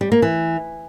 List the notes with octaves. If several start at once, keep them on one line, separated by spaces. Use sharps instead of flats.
G3
A#3
E3